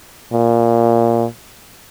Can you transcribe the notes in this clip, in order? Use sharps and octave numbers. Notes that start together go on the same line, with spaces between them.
A#2